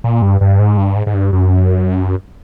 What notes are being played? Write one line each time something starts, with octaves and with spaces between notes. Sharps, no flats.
A#2
G2
G2
G#2
G2
G#2
G#2
G2
F#2